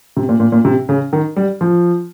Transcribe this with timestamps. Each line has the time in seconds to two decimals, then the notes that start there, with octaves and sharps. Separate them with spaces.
0.17 C3
0.29 A#2
0.40 A#2
0.52 A#2
0.65 C3
0.89 C#3
1.13 D#3
1.36 G3
1.61 F3